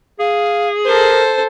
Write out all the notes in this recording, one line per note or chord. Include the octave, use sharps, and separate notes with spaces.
G#4 F5
A4 A#4 C5